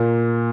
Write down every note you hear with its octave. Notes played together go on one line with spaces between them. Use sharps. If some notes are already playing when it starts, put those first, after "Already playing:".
Already playing: A#2